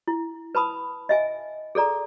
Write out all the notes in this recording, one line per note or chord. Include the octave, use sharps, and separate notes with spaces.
E4
B4 A5 B5 D#6
D#5 E5 G#5
G#4 A4 D5 A#5